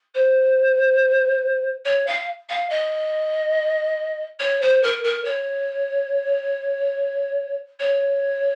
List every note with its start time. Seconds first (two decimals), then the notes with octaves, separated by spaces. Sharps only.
0.14 C5
1.85 C#5
2.06 F5
2.49 F5
2.69 D#5
4.39 C#5
4.61 C5
4.83 A#4
5.03 A#4
5.24 C#5
7.79 C#5